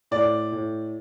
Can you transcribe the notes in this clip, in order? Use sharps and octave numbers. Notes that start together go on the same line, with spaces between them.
A2 D5
A2